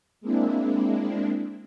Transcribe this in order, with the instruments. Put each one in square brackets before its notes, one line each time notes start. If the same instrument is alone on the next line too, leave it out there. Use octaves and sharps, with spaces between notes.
[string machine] G#3 A#3 C4 D4 E4